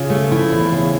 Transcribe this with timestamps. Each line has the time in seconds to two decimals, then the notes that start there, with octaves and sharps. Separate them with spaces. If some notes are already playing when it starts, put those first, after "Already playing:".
Already playing: C#3 F4
0.10 A3
0.31 F3 E4
0.52 E2
0.72 C#3